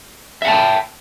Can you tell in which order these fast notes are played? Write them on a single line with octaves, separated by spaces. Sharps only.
E5 F#5 A5 G5